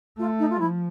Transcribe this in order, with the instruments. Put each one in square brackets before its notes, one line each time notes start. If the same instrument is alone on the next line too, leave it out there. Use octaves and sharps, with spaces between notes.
[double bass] A3 [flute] F4
[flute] D#4
F4
[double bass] F3 [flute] E4